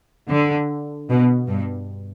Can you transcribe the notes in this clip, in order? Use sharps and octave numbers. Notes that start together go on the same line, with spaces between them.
D3
B2
G2